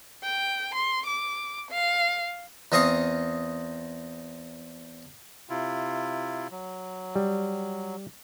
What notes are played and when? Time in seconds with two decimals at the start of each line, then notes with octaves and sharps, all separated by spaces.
0.23 G5
0.75 C6
1.06 D6
1.70 F5
2.72 E2 C4 D#5 F5 C#6 D#6
5.49 C3 E4 F4
6.51 F#3
7.16 G3